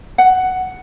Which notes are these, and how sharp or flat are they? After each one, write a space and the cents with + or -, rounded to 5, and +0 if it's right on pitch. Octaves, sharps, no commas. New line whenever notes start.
F#5 +5